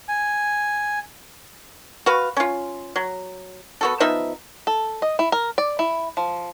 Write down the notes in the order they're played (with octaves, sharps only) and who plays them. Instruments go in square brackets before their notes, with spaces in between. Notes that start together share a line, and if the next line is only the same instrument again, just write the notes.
[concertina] G#5
[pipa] F#4 B4 F5
C#4 F4
F#3
B3 F#4 A4
F3 B3 D#4 E5
[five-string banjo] A4
D#5
E4
A#4
D5
E4
F3